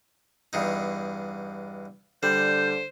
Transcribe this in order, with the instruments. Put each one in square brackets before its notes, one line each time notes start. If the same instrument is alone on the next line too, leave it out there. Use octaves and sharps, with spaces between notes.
[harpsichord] E2 G2 D#4
[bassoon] D3 [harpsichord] G3 [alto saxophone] C5 [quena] G6